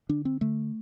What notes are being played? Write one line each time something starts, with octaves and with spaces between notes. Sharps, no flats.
D3 D4
C4
D3 A3